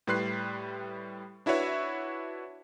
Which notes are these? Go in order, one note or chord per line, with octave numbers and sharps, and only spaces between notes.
A2 G3 B4 C6 F#6 C7
D4 E4 F#4 B4 C#5 E5